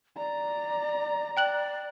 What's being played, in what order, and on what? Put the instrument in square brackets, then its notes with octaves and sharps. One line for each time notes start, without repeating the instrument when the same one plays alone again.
[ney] D5 [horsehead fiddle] A#5
[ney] D5 [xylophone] G5 F#6 F#7